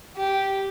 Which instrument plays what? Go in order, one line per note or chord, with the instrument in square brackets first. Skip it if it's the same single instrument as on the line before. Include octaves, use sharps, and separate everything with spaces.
[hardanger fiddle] G4